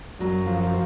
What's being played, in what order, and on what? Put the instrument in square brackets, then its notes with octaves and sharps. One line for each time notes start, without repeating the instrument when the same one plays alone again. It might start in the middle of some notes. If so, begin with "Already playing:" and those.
[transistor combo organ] F#2 [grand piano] F#3
[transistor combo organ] F3